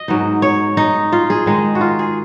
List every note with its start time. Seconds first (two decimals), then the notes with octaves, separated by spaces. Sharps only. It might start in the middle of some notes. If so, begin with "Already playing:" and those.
Already playing: D#5
0.08 G#2 F#3 B3 D#4
0.42 C#5
0.77 D#4
1.12 F4
1.30 G#4
1.46 D#3 G#3 D#4
1.75 F#4
1.81 F4
1.99 G#4